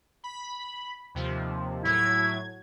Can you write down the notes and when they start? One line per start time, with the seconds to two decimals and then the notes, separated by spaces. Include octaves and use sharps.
0.24 B5
1.15 D#2 C3 F3
1.84 A2 F#3 E4 G#6